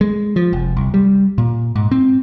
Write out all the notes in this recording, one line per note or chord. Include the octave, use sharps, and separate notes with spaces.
G#3
F3
F1
C2
G3
A#2
G#2
C4